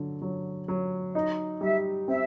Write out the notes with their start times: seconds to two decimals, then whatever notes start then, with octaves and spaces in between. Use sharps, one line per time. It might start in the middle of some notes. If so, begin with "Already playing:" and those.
Already playing: D3 F#3
0.22 F#3
0.68 F#3
1.14 D#4 D#5
1.61 G3 E5
2.07 C4 E5